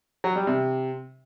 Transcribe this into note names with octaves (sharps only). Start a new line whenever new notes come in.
F#3
G3
C3